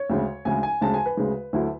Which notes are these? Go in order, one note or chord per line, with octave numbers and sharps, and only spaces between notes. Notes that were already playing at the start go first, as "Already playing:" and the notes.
Already playing: C#5
D2 C#3 G#3
D2 C#3 G#3 G#5
G#5
D2 C#3 G#3 A5
G#5
B4
D2 C#3 G#3
D2 D3 F#3 A3 E4